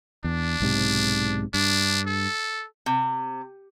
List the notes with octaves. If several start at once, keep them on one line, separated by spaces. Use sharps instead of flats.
E2 D4
B1 G#2 C3
G2 D4
A4
C3